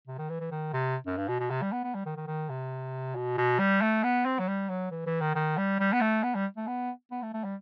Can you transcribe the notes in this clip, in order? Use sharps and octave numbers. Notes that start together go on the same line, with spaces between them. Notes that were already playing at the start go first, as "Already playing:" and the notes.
C3
D#3
E3
E3
D#3
C3
F#2
G2
B2
B2
C3
G3
B3
B3
G3
D#3
D#3
D#3
C3
B2
B2
G3
A3
B3
C4
F#3
G3
F#3
E3
E3
D#3
D#3
G3
G3
B3
A3
B3
G3
A3
B3
B3
A3
A3
G3